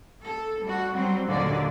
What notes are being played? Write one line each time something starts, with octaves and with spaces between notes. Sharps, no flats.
A4
G3 F#4
F#3 G3 C4
D#2 A#2 D3 F#3 A#3 D5